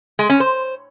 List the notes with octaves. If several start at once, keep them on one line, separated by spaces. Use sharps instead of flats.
G#3
C#4
C5